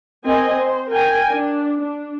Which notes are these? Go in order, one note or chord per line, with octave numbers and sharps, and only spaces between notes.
C4 A#4 D#5 G#5
C5
A#4 G5 G#5
D4
D4